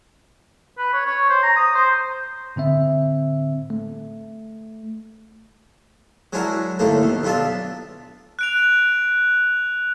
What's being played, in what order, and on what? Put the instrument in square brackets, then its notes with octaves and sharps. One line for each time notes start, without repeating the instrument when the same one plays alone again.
[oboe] B4
C#5
C#5
C5
A#5
D#6
C5
[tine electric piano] A2 D3 C4 E5
A3
[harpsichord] F#3 G#3 D4 E4 F#4 A#4
D#2 A2 D3 A3 A#3 D4
D#2 B2
B1 B3 D4 F4 E5 A5
[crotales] F#6 D7 F7